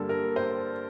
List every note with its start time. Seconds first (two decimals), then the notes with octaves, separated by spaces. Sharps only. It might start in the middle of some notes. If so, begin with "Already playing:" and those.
Already playing: G2 D3 G3 A#3 A4
0.09 A#4
0.36 C5